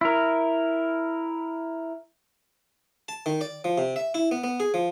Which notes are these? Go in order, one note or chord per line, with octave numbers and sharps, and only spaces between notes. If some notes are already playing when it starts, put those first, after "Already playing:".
E4 A#4
A5
D#3
D5
F3
C3
E5
E4
B3
B3
G#4
F3